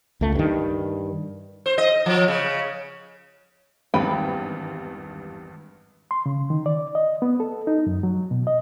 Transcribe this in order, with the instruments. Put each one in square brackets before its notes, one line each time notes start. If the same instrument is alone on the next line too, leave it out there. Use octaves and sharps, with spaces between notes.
[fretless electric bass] C#2 A3
G2 D#3
[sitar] C5
D#5
F3
C#3
[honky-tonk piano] G#1 E2 G2 [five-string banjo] B4 G5
[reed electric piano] C6
C#3
D#3
D5
D#5
B3
A4
D#4
F#2
F#3
B2
D#5